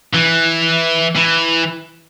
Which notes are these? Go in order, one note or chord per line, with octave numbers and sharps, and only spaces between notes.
E3
E3